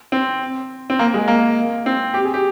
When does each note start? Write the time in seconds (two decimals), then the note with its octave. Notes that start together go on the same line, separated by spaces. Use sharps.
0.12 C4
0.90 C4
0.99 A#3
1.14 G#3
1.28 A#3
1.86 C4
2.14 G4
2.25 G#4
2.34 G4